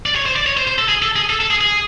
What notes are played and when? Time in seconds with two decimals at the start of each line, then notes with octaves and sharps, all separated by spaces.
0.06 D5
0.16 C#5
0.26 C5
0.36 D5
0.46 C#5
0.57 C5
0.67 C5
0.78 A4
0.89 G#4
1.02 A4
1.16 G#4
1.30 A4
1.40 A4
1.50 G#4
1.61 G#4